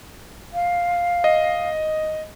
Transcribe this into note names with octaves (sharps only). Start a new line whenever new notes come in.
F5
D#5